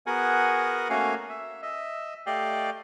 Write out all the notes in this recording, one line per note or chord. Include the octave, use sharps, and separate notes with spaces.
B3 F#4 G#4 A#4 F#5 G#5
A3 A#3 C#4 F#4 F5 G#5
E5
D#5 E5
A3 G4 D5 D#5 F5 G5